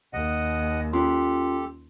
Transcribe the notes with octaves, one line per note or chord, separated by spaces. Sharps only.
D#2 D#5 F#5
C#4 F4 G4 A4 C6